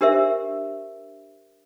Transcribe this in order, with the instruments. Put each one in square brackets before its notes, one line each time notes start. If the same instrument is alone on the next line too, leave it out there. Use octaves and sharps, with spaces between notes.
[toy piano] D4 G4 A#4 C5 E5